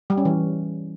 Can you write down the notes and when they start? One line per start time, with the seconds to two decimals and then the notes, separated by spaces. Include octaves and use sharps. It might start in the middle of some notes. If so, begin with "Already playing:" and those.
0.10 G3
0.18 C#4
0.25 E3